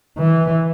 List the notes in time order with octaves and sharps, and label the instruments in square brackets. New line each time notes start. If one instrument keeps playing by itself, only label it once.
[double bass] E3